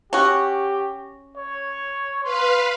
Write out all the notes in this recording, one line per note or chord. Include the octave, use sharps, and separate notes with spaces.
C#4 F#4 G4
C#5
B4 F5 C6